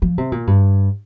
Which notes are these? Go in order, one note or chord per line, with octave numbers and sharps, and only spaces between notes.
F3
C3
A#2
G2